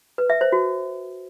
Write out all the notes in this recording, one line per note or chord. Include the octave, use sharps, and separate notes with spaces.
B4
E5
C5
F#4